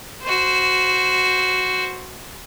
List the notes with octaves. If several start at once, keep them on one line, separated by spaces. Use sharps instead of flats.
F#4 C5